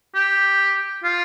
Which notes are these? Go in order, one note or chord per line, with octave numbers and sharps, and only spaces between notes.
G4
F4